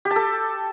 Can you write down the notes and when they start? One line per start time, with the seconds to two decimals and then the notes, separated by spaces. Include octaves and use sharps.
0.05 G4
0.11 A5
0.16 A4